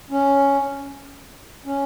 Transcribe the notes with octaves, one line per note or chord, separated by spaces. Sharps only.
C#4
C#4